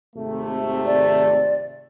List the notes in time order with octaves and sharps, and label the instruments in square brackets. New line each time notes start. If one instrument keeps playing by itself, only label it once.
[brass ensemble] G#1 C3 A3
[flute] D5